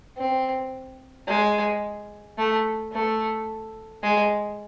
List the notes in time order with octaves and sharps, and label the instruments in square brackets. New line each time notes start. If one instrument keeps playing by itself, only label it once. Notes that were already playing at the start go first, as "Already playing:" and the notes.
[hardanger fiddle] C4
G#3
A3
A3
G#3